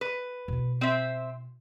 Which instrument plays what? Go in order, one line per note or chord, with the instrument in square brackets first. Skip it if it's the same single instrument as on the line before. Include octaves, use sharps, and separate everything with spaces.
[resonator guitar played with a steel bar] B4
[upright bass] B2 E4
[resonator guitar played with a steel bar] C4 C5 E5